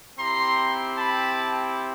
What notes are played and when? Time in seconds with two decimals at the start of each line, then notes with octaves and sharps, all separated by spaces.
0.19 C4 E4 G4 A#5 C6
0.99 A5 B5